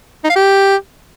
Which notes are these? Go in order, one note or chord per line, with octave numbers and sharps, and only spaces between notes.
D#4
F5
G4